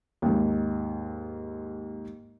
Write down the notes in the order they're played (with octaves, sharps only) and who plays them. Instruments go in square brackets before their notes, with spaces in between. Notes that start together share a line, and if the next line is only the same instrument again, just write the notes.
[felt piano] D#2 G#2